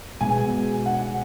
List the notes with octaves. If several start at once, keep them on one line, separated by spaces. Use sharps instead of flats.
B2 G#3 B3 G#5
F#5